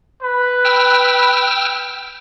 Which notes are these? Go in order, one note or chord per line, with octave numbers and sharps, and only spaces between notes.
B4
G5 E6 F6